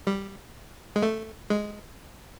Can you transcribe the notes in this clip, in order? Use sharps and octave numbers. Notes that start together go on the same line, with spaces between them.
G3
G#3
A3
G#3